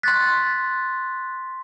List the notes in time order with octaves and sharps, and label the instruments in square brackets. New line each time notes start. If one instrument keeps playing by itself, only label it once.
[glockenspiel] C6 C#6 B6 [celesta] F#6 A6